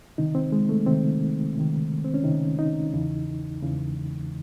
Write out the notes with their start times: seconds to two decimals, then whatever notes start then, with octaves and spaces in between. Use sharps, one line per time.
0.18 C#2 C3 D#3 D#4
0.35 C4
0.52 G#3
0.69 A3
0.87 C#2 C3 D#3 C4
1.55 C#2 C3 D#3
2.05 C4
2.14 C#4
2.24 C#2 C3 D#3 D#4
2.59 D#4
2.93 E2 C#3 E3
3.62 E2 C#3 E3